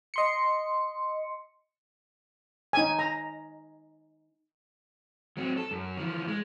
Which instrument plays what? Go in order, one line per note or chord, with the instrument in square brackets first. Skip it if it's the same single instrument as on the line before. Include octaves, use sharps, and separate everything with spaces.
[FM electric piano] D#5 C6 C#7
[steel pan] D#4 G#5
A#5
[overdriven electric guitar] F#3 C4
A4
F#2
E3 F3
G#3